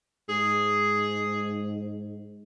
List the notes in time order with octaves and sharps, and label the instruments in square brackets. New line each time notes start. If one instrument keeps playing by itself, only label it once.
[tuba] G#2 [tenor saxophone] G#4